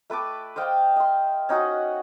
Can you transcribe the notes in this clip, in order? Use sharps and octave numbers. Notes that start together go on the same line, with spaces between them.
A3 B4 A5 D6
C5 D#5 F5 G5
D#5 C6
C#4 D#4 F#4 F#5